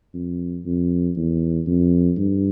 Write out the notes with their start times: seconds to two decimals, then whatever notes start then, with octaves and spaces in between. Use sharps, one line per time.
0.14 F2
0.65 F2
1.16 E2
1.67 F2
2.17 G2